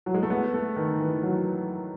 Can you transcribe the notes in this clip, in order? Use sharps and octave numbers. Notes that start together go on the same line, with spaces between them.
F#3
G#3
A3
B3
A3
D#3
E3
F#3